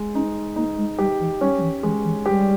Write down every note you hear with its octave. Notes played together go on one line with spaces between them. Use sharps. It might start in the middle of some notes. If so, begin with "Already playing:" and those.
Already playing: G#3
C#4 D#4
A#3 D#4
G#3
G3 G4
E3
G3 C#4
G3
E3
E3 G#3
E3
G3 G4